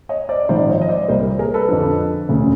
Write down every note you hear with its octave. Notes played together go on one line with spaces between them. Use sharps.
C#5 D#5
C5 D5
G#1 G#2 F3 C5 D5
C#5 D#5
D#5
C5 D5
C2 A#2 G3 A#4 C5
G#4 A#4
A4 B4
F2 D3 F3
E1 D2 C#3